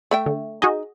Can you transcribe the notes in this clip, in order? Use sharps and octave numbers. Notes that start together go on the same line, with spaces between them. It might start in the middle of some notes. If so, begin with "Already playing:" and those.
A3 E5 G5
D3
D#4 F#4 G#4 D#5